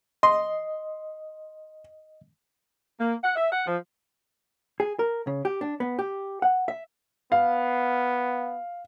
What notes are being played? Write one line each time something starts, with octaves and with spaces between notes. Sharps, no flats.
D#5 C6
A#3
F#5
E5
F#5
F3
G#4
A#4
C#3
G4
D4
B3
G4
F#5
E5
B3 F5